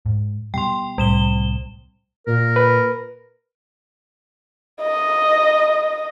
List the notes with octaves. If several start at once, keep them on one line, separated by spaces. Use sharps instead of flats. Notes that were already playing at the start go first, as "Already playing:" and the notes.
G#2
B2 G3 G5 C6
C2 A2 C3 G3 E7 G7
A#2 A#4
B4
D#5